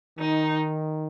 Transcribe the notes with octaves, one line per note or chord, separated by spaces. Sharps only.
D#3 D#4